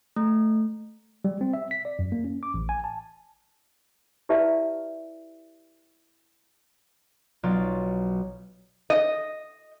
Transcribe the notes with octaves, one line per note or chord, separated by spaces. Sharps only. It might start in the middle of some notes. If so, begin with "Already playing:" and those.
A3
G3
C4
E5
B6
D5
F#2
A#3
C#4
D6
A1
G#5
A5
E4 G4 B4 D5 E5 A5
B1 F#3 F4 D5
D#5